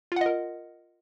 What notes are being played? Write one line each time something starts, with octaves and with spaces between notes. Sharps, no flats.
F4 A#4 D#5 F#5